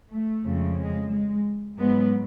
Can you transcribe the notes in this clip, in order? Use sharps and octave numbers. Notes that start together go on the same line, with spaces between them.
A3
F2 C#3 G#3
G#3
G#3
G#2 F#3 G#3 B3